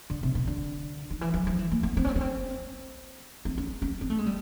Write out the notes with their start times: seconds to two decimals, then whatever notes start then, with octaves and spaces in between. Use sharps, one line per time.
0.10 D3
0.23 C3
0.35 B2
0.47 D3
1.10 D#3
1.21 E3
1.34 F3
1.47 F3
1.59 E3
1.72 A#3
1.83 B3
1.97 C4
2.05 C#4
2.09 C4
2.15 B3
2.21 C4
3.45 C4
3.58 C#4
3.82 C#4
4.01 C4
4.10 A3
4.18 G#3
4.26 G3